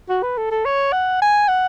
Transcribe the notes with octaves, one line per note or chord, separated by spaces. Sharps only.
F#4
B4
A4
A4
C#5
F#5
G#5
F#5